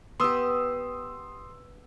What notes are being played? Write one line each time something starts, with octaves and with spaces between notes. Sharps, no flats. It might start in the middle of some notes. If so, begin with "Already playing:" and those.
B3 G4 C6 D#6 E6